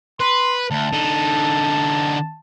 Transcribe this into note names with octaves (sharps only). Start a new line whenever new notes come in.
B4 C6
D2 A5
D3 D#4